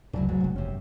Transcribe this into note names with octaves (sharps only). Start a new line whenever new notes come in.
F1 C#2 F#2 F#3 E4 D5
G#2 F#3
F#1 G2
C3 C#4